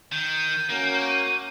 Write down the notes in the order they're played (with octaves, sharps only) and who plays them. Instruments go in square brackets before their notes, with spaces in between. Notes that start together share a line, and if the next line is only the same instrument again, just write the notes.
[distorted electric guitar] D#3 [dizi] G6
[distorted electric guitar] A#3 [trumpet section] C#4 F#4 A#4
[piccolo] D#7